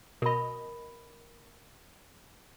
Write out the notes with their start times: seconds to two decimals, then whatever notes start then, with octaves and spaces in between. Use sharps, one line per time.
0.22 B2 A#4 D#5 B5